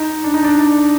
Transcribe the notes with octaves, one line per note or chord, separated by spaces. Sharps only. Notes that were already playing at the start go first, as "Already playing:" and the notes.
Already playing: D#4
D4
D#4
D4